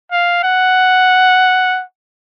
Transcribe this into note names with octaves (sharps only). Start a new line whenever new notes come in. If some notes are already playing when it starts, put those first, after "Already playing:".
F5
F#5